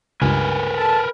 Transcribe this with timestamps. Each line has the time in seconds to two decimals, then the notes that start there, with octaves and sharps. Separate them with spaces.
0.22 C#2 G2 A#4 B4 G#5
0.77 A4 A5